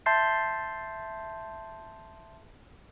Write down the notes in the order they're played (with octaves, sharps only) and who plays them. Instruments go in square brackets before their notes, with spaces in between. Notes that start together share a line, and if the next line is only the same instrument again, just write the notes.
[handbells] E5 A5 C6 G6 A6 C7